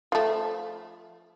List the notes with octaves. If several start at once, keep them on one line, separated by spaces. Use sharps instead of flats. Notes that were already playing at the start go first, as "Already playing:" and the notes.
F3 A3